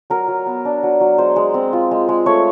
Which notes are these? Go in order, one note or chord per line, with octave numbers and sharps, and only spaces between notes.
F#3 A#4
F#3
B3
D4
F#3
F#3
G#3 C5
G#3
C4
F4
G#3
G#3
A3 C#5